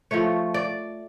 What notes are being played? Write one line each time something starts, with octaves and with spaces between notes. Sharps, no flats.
F3 A3 C#5
D5